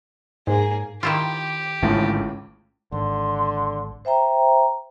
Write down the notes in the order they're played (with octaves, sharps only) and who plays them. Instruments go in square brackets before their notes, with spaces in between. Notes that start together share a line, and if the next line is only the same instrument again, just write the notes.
[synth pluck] G#2 [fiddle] A#3 G#4
[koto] D#3 E4 F4 [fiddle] G4
[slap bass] G#1 D3 C#4 [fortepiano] C#2 A2
[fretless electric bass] G#1 [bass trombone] D3 [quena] C6
[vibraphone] C5 E5 G5 A#5